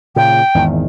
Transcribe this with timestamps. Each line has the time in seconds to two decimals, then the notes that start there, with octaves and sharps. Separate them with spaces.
0.16 A#2 C#3 G5
0.54 G#1 E2 D#3